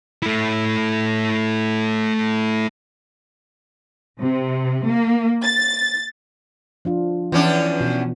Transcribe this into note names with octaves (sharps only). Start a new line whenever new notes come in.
A3 E4
C3
A#3
A6
F3 D4 F4
E2 E3 C#4 D4
B2 E3 F#4